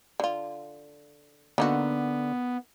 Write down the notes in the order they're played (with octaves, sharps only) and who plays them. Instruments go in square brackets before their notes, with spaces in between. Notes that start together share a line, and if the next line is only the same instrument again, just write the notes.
[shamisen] D3 F4
[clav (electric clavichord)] D3 [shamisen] A#3 D#4 F#4 [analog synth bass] B3